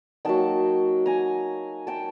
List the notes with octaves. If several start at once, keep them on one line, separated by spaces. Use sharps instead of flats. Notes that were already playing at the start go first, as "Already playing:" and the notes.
F#3 A#3 D#4 G5 A5
G#5 A#5
G5 A5